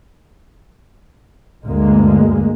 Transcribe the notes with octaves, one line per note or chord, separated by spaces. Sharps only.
D2 G2 G#3 A#3